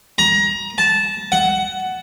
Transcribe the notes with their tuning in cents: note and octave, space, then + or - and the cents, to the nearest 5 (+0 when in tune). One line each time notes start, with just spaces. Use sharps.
A#5 +25
A5 -10
F#5 +15